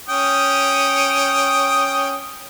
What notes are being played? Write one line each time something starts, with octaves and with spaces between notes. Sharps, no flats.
C#4 G5 D#6